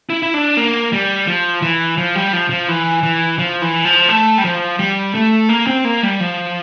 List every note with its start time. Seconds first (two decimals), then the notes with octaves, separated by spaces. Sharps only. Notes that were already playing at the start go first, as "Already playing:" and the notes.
0.10 E4
0.23 E4
0.34 D4
0.57 A#3
0.92 G3
1.28 F3
1.62 E3
1.98 F3
2.15 G3
2.33 F3
2.50 F3
2.68 E3
3.03 E3
3.39 F3
3.61 E3
3.85 F3
4.09 A3
4.38 G3
4.44 F3
4.79 G3
5.15 A3
5.49 A#3
5.67 C4
5.85 A#3
6.03 G3
6.20 F3